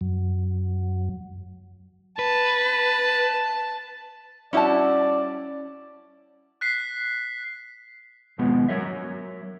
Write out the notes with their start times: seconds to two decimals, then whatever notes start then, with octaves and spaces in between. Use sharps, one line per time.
0.01 F#2 F#3
2.19 B4 A5
4.53 G3 C#4 E4 F#4 D5 A5
6.61 F#6 B6 C7
8.38 D#2 G#2 B2 F3 G#3 B3
8.69 F#3 A#4 C#5 E5